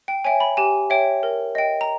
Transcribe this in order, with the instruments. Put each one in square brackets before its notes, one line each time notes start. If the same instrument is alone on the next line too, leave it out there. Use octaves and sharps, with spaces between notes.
[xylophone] G5
C#5 E5 G5 G#5
B5
G4 G#5
C#5 E5 G5
A#4
D#5 G5
A#5